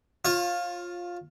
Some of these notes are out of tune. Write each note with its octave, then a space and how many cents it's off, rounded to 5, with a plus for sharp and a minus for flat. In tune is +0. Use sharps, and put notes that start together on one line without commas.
F4 +10 C#5 -35